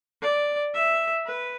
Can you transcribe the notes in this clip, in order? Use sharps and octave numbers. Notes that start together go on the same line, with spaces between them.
D5
E5
B4